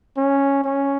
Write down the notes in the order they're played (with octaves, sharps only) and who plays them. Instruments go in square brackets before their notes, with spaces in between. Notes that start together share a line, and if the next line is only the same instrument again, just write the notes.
[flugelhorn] C#4
C#4